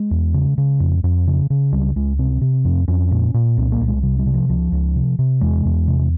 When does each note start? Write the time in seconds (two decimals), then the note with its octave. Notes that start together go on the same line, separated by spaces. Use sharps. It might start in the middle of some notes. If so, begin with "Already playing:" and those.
Already playing: G#3
0.11 E2
0.34 C#3
0.58 C#3
0.80 F2
1.04 F2
1.27 C#3
1.50 C#3
1.72 C#2 G3
1.96 C#2 G#3
2.19 C3 C4
2.41 C3
2.65 F2 C4
2.88 F2 C#4
3.11 A#2
3.34 A#2
3.57 C2 C4
3.72 A#3
3.81 C2
3.88 G#3
4.03 C3 G3
4.19 G3
4.26 C3
4.34 F3
4.49 C#2 F3
4.72 C#2
4.96 C3
5.19 C3
5.41 E2 G#3
5.65 E2
5.88 C3